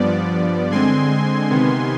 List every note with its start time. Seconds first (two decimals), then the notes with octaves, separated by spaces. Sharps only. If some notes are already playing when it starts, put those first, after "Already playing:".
Already playing: G2 F3 B3 D5
0.70 D3 G#3 C4 G#5 C6
1.50 C3 D#3 B3